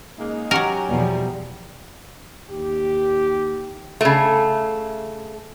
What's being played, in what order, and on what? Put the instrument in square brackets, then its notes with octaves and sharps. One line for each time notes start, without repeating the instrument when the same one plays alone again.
[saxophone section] C#3 G#3 A#3 [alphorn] D#4
[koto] F#3 F#4 A#4 [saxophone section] C#4 G4
[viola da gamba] E2 B2 F3 [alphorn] G3
[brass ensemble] D#2 G4
[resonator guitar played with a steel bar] C#3 A3